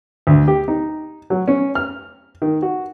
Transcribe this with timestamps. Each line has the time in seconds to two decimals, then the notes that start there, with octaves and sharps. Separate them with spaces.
0.27 D2
0.48 G4
0.68 D#4
1.30 F#3
1.48 C#4
1.75 F6
2.42 D#3
2.62 F#4